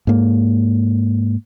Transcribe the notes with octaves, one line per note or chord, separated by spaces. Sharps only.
G#2 A#3